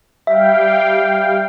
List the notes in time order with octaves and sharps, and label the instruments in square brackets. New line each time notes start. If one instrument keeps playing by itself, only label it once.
[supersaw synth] G3 F5 G5 [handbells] E5